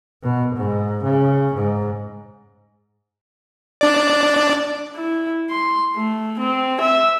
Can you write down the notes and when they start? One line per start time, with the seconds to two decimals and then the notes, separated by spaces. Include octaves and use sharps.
0.23 B2
0.56 G#2
1.04 C#3
1.55 G#2
3.81 D4 D5
4.96 E4
5.50 C6
5.95 A3
6.39 C4
6.81 E5